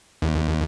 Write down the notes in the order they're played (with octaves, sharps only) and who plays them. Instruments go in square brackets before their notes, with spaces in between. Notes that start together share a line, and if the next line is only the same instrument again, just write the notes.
[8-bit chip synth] D#2